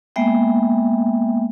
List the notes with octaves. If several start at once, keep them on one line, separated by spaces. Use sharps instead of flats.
G#3 A#3 B3 E5 G5